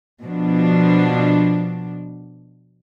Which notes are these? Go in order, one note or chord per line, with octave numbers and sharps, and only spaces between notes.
B2 F3 D4